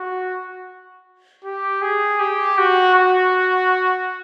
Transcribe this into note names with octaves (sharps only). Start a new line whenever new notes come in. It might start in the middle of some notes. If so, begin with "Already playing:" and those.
Already playing: F#4
G4
G#4
G4
F#4
F#4